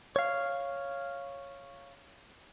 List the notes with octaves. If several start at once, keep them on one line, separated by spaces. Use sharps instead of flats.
C#5 F5